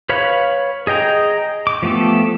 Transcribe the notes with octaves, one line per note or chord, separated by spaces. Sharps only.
B4 C#5 F5 B5
G#4 D#5 G5 A#5
D6
F3 A3 B3 G4 A4